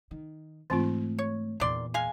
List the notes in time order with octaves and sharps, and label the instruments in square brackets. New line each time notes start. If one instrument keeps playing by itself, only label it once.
[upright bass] D#3
[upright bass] G#2 A3 [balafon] E3 C4 F4
[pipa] C#5
[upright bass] E2 A#2 [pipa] D#3 D5 C6
[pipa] G#3 F5 G#5